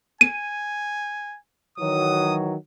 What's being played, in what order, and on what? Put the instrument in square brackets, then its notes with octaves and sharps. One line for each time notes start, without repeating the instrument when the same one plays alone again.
[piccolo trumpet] G#5 [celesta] D#7
[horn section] D#3 E3 F#3 [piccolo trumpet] D#6